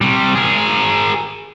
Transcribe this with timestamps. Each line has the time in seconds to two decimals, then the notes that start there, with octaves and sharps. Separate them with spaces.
0.01 C3 G3
0.35 G#4 A#4